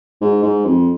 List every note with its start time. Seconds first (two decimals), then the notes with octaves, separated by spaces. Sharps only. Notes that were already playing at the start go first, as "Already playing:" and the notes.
0.21 G#2
0.43 G#2
0.65 F2